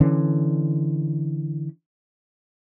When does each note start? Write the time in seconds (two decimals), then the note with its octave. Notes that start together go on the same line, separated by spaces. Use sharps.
0.01 D3 E3 C#4